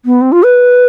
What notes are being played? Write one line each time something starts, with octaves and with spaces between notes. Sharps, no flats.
B3
C4
F4
B4